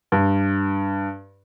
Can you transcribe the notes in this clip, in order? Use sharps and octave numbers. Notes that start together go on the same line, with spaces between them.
G2